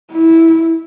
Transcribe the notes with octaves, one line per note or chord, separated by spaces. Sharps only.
E4